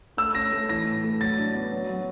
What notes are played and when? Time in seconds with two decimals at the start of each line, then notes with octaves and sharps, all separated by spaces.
0.17 A3 E6
0.35 C#4 A#6
0.52 A3
0.69 E3 A#6
0.85 A2
1.04 A3
1.21 F#3 A6
1.38 D4
1.55 B3
1.72 F#3
1.89 F#3